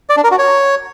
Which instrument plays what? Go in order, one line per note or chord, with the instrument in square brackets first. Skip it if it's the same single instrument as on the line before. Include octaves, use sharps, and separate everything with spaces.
[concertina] D5
D4
A#4
F#4
C#5